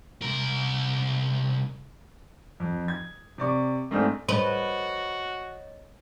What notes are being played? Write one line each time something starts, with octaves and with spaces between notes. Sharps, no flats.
C2 A#4
F2
G#6
C3 D5 C#6 D6
G#2 A3 C4 D4 G#4 F6
F#4 B4 C#5 D#5